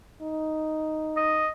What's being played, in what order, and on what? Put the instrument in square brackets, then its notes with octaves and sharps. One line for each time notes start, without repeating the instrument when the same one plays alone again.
[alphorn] D#4
[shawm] D#5